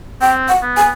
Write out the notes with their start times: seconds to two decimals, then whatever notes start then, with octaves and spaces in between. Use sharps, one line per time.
0.21 C4 G5
0.48 F#5
0.62 B3
0.77 G#5